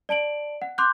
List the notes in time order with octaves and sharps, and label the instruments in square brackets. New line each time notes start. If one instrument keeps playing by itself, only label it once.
[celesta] D5 A5 D7 F#7
F#5
C6 D6 F#6 G6